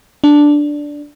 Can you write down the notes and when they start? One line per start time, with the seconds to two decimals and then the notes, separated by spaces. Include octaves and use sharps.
0.24 D4